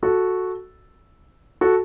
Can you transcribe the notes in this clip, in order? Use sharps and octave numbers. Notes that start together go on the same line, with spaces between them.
F#4 A4
F#4 A4